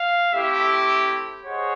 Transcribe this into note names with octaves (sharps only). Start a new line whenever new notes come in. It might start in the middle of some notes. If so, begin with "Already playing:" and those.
Already playing: F5
A3 C4 E4 G4 E5
G#4 C5 C#5 D#5 F#5